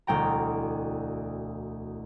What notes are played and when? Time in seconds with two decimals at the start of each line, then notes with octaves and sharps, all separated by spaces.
0.07 E1 D2 G5 A#5